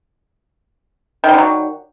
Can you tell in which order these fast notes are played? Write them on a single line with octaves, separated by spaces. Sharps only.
D#3 G3 D3 F#3